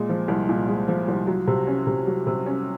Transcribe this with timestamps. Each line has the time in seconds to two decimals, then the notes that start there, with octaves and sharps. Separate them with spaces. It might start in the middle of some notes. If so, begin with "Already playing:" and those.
Already playing: A#2 G#3
0.09 F3
0.28 C2
0.49 A#2
0.68 G#3
0.88 F3
1.08 C2
1.27 F#3
1.47 C3
1.67 C#4
1.87 C3
2.07 F#3
2.27 C3
2.46 C#4